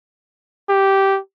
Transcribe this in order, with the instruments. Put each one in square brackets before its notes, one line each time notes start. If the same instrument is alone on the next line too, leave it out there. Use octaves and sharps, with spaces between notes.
[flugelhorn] G4